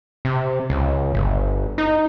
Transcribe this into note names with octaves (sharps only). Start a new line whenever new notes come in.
C3
C#2
G1
D#4